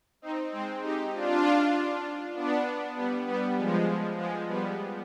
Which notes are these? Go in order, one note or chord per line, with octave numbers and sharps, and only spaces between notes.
C4 D#4
G#3 C4
D#4 G4
D4 F4
B3 D4
G3 B3
G3 B3
F3 G#3
F3 G#3
G3 B3